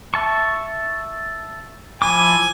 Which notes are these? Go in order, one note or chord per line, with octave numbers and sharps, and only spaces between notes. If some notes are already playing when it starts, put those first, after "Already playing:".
E5 A5 C#6
F3 E4 G#5 D6